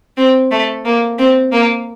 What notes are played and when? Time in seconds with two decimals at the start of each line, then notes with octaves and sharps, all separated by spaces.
0.17 C4
0.51 A3
0.85 A#3
1.18 C4
1.52 A#3